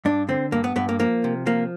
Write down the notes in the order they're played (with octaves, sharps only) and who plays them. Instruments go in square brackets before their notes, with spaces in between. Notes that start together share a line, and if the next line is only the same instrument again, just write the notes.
[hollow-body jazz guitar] G2 D4
D3 C4
G2 A#3
B3
G2 B3
A#3
F3 A#3
C3
F3 A#3